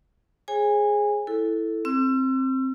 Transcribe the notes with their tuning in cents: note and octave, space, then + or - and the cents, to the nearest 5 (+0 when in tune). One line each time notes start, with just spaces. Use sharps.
G#4 +5 C#5 -45 G#5 -25
E4 +0 A4 +0
C4 +10 E6 +40